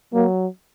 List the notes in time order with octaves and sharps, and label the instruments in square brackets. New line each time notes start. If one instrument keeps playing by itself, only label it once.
[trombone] F#3 [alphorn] A#3